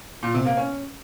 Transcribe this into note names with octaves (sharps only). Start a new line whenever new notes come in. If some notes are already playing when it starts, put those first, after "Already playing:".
A#2
C3
A#3
C#4